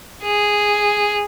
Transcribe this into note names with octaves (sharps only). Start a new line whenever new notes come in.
G#4